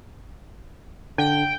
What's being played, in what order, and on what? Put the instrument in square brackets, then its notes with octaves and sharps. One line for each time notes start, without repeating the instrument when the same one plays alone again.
[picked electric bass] D3 [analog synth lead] G5